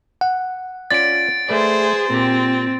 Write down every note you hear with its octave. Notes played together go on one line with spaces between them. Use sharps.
F#5
C#4 F4 D5 A6 D7
A3 G#4 B4 C5 D5
A#2 C4 G4